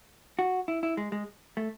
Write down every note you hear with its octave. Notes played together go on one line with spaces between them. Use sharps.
F#4
E4
E4
G#3
G#3
A3